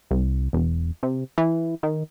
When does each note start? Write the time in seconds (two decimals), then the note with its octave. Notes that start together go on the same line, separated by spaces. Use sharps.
0.11 C2
0.53 E1
1.03 C3
1.38 E3
1.83 D#3